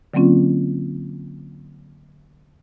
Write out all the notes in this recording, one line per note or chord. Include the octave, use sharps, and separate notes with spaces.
D3 F#3 A#3 C4 C#4 F4